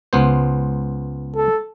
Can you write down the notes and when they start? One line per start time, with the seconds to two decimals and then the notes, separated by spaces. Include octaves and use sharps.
0.13 C#2 B3 C5
1.36 A4